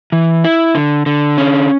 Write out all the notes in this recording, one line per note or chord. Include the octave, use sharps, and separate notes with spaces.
E3
E4
D3
D3
C#4